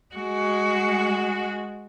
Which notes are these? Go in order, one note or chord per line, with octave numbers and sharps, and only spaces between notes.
G#3 F#4